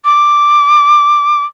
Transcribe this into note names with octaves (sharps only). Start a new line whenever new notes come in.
D6